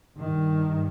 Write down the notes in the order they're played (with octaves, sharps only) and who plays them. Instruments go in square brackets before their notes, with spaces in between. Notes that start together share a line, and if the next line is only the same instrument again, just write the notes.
[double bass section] G2 D#3